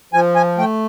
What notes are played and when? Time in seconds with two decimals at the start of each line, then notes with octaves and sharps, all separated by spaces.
0.14 F3 G#5
0.35 G#5
0.58 A3 G5